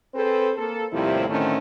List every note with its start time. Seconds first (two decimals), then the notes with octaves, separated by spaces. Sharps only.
0.15 C4 G#4 A4 B4 C5
0.57 A#3 A4
0.91 D#2 A2 C3 F3 G3 E4
1.28 A2 D3 D#3 A3 C4 C#4